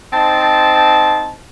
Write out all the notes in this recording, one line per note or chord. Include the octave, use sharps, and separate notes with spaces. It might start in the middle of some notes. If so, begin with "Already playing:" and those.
C4 D#4 C5 A5